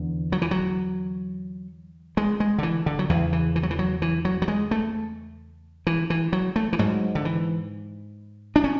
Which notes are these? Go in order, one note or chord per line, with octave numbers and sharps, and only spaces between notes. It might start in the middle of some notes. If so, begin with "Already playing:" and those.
Already playing: E2 D3
F#3
E3
F#3
G#3
G#3
D3
E3
D3
F#3
E2 C#3 E3
E3
E3
F#3
E3
F#3
E3
F#3
F#3
G#3
A3
E3
E3
F#3
A3
E3
G#2 F#3
D3
E3
D4
C#4